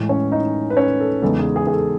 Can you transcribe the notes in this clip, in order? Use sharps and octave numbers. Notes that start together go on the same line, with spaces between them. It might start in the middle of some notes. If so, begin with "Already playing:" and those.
Already playing: A2 E3 G#3
C#4 C#5
D#4 D#5
B4
C#4 C#5
A4
E2 C#3 G#3 B3 D#4 A4
G#4
G#4
G#4
A4